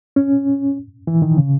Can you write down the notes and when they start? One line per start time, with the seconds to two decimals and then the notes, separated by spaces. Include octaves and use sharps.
0.16 C#4
1.07 E3
1.22 D#3
1.37 C#3